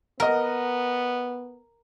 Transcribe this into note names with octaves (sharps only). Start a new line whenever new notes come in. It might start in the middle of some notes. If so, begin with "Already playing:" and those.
B3 A#4 D#5 F#5